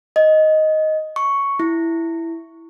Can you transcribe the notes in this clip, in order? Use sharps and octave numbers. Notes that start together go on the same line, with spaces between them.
D#5
C#6
E4